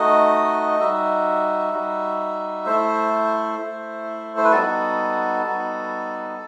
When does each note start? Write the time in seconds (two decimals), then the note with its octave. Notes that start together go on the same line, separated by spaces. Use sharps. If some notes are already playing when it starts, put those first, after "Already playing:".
Already playing: A3 D#4 F#4 D#5
0.80 G3 D#4 F#4 E5
1.73 G3 D#4 F#4
2.66 A3 E4 C5
3.59 A3 E4
4.37 C5
4.44 B4
4.52 G3 B3 D#4 F#4 A4
5.45 G3 B3 D#4 F#4